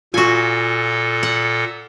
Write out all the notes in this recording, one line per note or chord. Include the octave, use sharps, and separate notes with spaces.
A#2 F4 F#4 A4 G#5
F#5